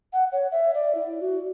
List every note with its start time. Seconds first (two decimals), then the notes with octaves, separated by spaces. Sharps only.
0.13 F#5
0.32 C#5
0.52 E5
0.74 D5
0.95 E4
1.20 F#4